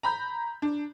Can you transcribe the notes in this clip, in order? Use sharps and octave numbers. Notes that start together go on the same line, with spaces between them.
A#5 B5 G6
D4